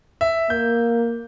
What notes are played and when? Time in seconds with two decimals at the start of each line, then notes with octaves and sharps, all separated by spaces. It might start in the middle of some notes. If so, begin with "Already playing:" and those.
0.21 E5
0.50 A#3 G6